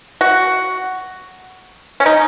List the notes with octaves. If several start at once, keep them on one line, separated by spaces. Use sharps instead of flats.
F#4
C#4
D#4